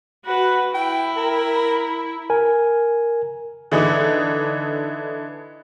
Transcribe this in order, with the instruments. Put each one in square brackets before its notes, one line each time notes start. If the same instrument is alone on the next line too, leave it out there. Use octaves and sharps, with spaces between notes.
[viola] F#4 B4
[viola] E4 [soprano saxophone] G5
[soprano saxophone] A#4
[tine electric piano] A#4 G#5
[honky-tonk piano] D3 E3 D#4